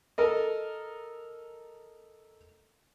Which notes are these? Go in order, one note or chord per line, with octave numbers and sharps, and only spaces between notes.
A4 A#4 D#5